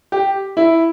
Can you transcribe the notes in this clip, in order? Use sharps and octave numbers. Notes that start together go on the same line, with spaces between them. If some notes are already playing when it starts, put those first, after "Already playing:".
G4
E4